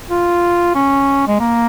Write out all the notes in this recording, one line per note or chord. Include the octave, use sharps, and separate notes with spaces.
F4
C#4
G#3
A#3